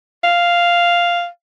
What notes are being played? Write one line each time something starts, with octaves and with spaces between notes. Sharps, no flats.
F5